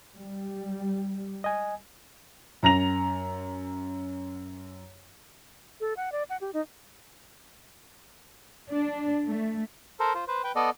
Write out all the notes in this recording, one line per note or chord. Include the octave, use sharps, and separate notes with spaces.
G3
D#5 G#5
F#2 A#5 A#6 F7
A4
F#5
D5
F#5
G4
D#4
D4
A3
A4 A#4 C5
F4 C5
B4 C5
B4 G5
B3 A4 D5 D#5